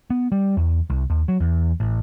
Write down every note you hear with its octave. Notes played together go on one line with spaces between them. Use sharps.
B3
G3
E2
C2
D#2
F#3
E2
A1